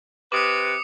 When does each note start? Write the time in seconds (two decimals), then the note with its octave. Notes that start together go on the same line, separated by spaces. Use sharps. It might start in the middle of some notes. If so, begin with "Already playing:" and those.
0.32 C3 B4 D6 D#6 C#7